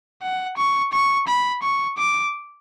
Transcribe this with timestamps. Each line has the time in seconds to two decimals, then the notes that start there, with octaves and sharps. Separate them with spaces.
0.23 F#5
0.58 C#6
0.93 C#6
1.28 B5
1.63 C#6
1.98 D6